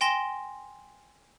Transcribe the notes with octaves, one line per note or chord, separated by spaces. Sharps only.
G5 G#5 C6 A#6 E7 G7